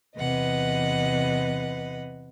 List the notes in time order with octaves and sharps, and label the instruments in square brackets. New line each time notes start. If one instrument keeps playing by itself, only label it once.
[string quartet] E2 C3 B4 D#5 F#5